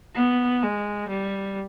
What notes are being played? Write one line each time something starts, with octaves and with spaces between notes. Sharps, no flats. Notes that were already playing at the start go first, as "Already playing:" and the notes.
B3
G#3
G3